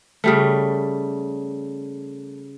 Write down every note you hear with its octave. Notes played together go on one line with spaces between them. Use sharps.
C#3 G3 A3